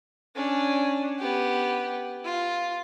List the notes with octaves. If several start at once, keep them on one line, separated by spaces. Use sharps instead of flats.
C#4 D4
B3 G4
F4